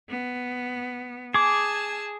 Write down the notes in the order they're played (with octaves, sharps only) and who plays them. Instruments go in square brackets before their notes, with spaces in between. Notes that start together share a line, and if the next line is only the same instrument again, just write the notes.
[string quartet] B3
[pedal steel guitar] G#4 D6 [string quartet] G#5 A5 E6